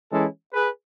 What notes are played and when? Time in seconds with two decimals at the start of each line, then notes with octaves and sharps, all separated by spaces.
0.11 E3 G#3 C#4 E4 A4
0.54 G#4 B4